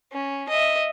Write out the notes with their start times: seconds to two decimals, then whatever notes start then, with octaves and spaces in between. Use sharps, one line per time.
0.12 C#4
0.49 D#5 E5